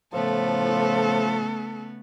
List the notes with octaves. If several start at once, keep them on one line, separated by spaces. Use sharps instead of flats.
A2 C#3 F3 A3 B3 A4